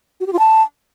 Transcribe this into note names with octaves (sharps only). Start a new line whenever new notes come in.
F#4
G4
F4
A5